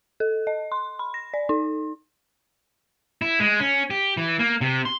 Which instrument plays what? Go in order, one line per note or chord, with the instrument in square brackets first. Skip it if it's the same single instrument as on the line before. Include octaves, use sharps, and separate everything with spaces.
[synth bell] A4
D#5
C6
B5
A#6
D5
D#4
[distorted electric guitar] E4
G#3
C#4
G4
E3
A#3
C3
C6